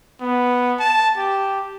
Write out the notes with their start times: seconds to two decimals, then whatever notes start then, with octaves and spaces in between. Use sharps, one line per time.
0.21 B3
0.79 A5
1.17 G4